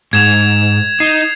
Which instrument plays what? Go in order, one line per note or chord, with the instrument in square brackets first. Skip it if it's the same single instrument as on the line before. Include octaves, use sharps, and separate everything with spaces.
[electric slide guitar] G#2 [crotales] G#6 E7 F7
[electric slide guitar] D#4 [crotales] C7